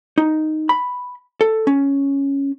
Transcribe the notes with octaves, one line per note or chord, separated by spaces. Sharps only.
D#4
B5
A4
C#4